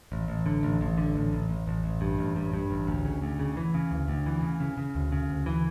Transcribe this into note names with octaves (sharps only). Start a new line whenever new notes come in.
A1
A1
D3
A1
A1
D3
A1
A1
A1
A1
A1
G2
A1
G2
G2
A1
D2
C#3
D2
C#3
E3
C#3
D2
D2
E3
C#3
C#3
C#3
D2
C#3
D2
E3